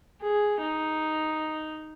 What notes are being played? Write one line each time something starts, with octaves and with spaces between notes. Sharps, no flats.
G#4
D#4